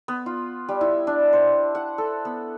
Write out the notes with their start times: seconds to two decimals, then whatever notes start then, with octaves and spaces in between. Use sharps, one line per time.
0.08 B3
0.26 F4
0.68 G3
0.81 E4
1.07 D4
1.33 C5
1.75 F#5
1.98 A4
2.25 B3